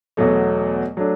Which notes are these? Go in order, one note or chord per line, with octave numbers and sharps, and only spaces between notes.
E2 B2 F#3 A3
F#3 A3 D4